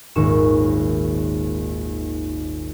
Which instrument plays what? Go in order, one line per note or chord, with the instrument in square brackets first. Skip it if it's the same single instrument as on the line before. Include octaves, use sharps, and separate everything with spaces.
[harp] D#1 G#1 D#2 C#6 E7